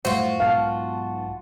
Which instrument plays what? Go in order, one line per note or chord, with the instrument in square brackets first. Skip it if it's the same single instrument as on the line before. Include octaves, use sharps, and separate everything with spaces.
[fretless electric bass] F#2 A2 G3 [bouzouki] F4 F#4 [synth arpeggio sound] C5
[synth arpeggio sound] B1 A5 [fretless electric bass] G#2 B2 [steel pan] F5